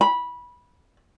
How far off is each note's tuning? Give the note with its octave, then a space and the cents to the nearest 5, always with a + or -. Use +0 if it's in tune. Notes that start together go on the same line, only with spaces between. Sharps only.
B5 -15